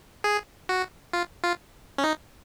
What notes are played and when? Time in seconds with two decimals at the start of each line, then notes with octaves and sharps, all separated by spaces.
0.24 G#4
0.69 F#4
1.13 F4
1.44 F4
1.98 C#4
2.04 D#4